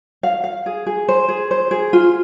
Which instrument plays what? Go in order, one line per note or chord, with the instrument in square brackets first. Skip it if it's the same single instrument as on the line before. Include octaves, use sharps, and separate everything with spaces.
[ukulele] F5
F5
G#4
G#4
C5
G#4
C5
G#4
F4